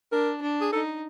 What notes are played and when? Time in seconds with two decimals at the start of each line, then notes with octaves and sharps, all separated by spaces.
0.12 D4 A#4
0.42 D4
0.61 G#4
0.72 D#4 A4